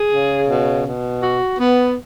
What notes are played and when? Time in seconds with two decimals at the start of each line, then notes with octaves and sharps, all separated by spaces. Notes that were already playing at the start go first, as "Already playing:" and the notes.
Already playing: G#4
0.11 C#3
0.48 B2
0.85 B2
1.23 F#4
1.60 B3